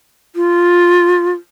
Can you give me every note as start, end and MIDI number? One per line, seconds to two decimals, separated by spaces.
0.36 1.31 65